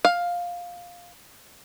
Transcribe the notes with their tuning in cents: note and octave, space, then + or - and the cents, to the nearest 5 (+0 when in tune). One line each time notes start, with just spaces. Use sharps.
F5 +10